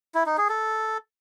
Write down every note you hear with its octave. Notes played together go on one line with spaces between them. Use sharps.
E4
D#4
G#4
A4